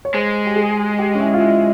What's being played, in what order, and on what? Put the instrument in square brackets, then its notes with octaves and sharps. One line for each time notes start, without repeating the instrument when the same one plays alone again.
[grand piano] C#5
[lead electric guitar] G#3 [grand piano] C5
[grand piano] G4
G#4
G4
C#4
E4
F4
E4